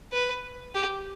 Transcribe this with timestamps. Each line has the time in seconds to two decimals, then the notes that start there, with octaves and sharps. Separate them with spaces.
0.13 B4
0.75 G4